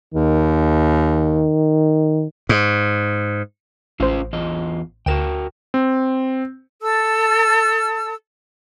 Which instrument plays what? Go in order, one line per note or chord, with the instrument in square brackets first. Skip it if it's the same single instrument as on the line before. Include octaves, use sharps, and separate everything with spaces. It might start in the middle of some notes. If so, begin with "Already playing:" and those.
[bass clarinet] D#2 [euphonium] D#3
[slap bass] G#2
[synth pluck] A1 C5 [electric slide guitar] C#4 F4 F5
[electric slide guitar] E2 F4 D#5
[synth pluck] D2 E7 [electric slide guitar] F#4 A#4 G5
[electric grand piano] C4
[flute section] A4 A5 E6